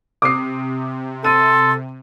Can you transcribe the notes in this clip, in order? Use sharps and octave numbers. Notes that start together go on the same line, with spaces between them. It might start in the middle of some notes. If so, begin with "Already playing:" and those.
C3 D6 D#6 C7
A4 C6 D#7